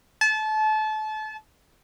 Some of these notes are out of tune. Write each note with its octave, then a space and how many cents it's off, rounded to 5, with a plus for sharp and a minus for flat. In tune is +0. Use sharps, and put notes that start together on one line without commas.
A5 -30